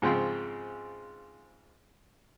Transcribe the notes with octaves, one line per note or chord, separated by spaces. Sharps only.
G#2 C#3 F3 C4